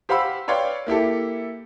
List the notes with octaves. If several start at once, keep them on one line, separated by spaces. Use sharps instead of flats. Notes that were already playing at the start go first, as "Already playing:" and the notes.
G4 C5 F5 F#5 B5 E6
B4 C#5 D5 F5 G5 C6
A#3 E4 G4 A4